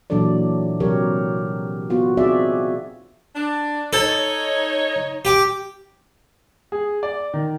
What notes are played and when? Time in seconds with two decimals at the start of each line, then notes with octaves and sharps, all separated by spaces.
0.10 A#2 E3 F#3 D4 A4 D5
0.80 C3 F#3 G4 A#4 C#5
1.90 B3 F4 F#4
2.17 C4 D#4 F#4 G#4 D5 E5
3.36 D4
3.93 D#4 A4 C#5
5.25 G4 D6
6.72 G#4
7.03 D5
7.34 D#3